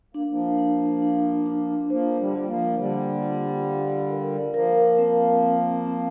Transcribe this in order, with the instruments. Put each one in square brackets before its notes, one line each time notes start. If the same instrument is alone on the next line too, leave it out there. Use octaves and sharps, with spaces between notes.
[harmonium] A#3 [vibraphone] D4
[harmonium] F3 A#3
[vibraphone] D4
D4
D4
[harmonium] F3 A#3 [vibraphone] C5
[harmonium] D3 G3
[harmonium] G3 [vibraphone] F4
[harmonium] F3 A#3
[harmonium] D3 G3 [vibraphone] A#3
[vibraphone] F4
F5
A#4
[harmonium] F3 A#3 [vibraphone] A#4
[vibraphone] C4
C4
C4